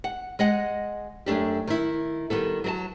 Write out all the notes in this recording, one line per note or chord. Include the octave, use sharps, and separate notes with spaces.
F#5
G#3 D#5 F#5
F#2 A3 D4 G4
D#3 E4
D#3 G3 B3 A4
F#3 A#4 A5